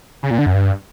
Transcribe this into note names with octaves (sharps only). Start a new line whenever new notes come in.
C#3
A#2
D3
F#2
G2